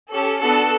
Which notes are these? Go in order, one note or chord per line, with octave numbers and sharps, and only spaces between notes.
C#4 G4 A4
B3 D4 F#4 A4